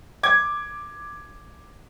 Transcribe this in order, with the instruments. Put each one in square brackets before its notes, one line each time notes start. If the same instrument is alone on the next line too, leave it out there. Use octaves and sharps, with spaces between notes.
[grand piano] D6 G#6